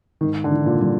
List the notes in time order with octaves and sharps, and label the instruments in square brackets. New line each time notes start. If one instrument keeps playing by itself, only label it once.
[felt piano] G#2 [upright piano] D#3
[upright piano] D3
[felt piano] E3
[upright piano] A#2
[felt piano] G3